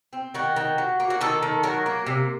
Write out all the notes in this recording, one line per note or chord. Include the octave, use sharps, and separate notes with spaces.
C4
D#3 F#4
D#3
F#3
A#3
F#4
D#3 A4
D#3
F#3 A#4
A#3
C3